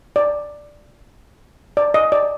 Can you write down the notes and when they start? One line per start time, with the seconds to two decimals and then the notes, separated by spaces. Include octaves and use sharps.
0.16 D5
1.77 D5
1.94 D#5
2.12 D5